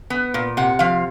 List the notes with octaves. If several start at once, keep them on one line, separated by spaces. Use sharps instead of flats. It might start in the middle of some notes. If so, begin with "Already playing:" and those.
B3
A#2
C3 F#5
F3 F5